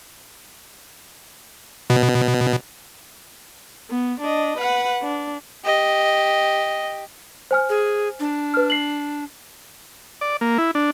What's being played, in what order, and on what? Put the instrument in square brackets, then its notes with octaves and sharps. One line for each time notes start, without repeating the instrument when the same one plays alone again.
[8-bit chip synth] B2
[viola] B3
D4 D#5
B4 F#5
D4
[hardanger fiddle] G4 [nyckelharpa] D#5
[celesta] C5 G#5 F6
[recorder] G#4
D4
[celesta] B4 F6
C7 F#7
[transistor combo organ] D5
A#3
E4
D4